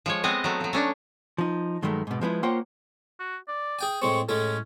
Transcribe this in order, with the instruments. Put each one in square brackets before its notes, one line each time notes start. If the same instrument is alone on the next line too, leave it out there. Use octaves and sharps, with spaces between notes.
[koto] F3 G#3 C#5
G#3 B3 C4 D#5
F#3 A3
F3 F#3
A3 C#4 D4
[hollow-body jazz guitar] F3 D#4
G2 D#3 F#3 G#3 A3
G#2 B2
F3 G#3 B3 E4
A#3 F4 C5 C#5 F#5 G5
[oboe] F#4
D5
[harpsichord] G#4 G5 G#5
[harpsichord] A2 G#3 C4 [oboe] C#6
[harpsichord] A2 G#3 A3 [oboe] C#4